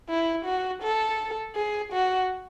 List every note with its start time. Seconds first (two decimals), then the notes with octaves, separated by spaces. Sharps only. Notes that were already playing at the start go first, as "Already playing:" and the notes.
0.09 E4
0.45 F#4
0.83 A4
1.56 G#4
1.93 F#4